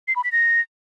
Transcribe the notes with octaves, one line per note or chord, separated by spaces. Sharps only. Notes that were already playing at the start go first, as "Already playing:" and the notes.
C7
B5
B6
A#6